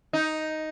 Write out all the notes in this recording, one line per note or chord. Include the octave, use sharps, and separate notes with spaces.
D#4